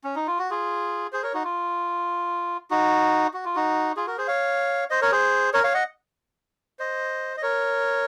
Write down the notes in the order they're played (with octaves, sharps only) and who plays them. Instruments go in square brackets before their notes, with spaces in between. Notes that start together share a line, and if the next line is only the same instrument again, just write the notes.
[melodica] C#4
D#4
F4
F#4
F4 G#4
G#4 C5
A#4 C#5
D#4 F#4
F4
D#4 F#4
F#4
F4
D#4 F#4
F4 G#4
F#4 A#4
G#4 C5
C#5 F5
C5 D#5
A#4 C#5
G#4 C5
A#4 C#5
C#5 F5
D#5 F#5
C5 D#5
D#5
A#4 C#5